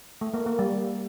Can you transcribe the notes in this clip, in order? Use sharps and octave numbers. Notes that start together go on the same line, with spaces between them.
A3
A#3
A#3
G3